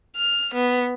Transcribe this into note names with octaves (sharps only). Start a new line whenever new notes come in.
F6
B3